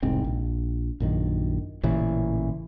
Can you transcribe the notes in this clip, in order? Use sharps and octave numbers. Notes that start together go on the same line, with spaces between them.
F1 C2 G#2 C4
A#1
A#1 F#2 D#3
A1 A#2 C#3 E3